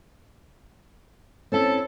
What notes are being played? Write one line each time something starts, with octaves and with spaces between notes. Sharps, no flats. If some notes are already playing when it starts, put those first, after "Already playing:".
C4 C#4 E4 A4